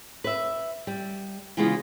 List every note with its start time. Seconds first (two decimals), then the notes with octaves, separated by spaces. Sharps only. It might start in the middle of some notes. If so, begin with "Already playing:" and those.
0.24 B4 E5
0.87 G3
1.57 C#3 E3 G#3 B3 F4